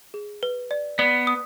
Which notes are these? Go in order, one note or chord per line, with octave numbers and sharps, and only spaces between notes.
G#4
B4
D5
B3 D5
D#6